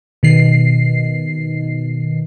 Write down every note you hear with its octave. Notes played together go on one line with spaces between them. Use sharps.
B2 D#3 C7